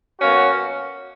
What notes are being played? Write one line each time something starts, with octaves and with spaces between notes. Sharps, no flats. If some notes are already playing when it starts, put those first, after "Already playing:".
B2 F#3 A#3 C#4 F#4